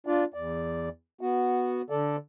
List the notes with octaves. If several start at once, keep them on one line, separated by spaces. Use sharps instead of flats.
D4 F4 D5
E2 D5
B3 F#4
D3 A4 D5